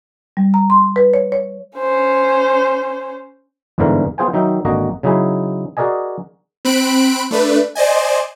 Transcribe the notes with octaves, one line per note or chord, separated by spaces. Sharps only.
G3
A#5
C6
B4
C#5
C#5
C#4 C5
G1 E2 G#2 D3 E3 A#4
B3 F4 G#4 C5 G5 G#5
D#3 F#3 D#4 E5 G5
G#1 D3 A#3 F#4 D#5 A#5
C#3 F#3 D#4 E4 G#4
F#4 G#4 A#4 D5 D#5 G#5
C4 B5 F#6 D7
A3 D4 B4
C5 D5 D#5 G#5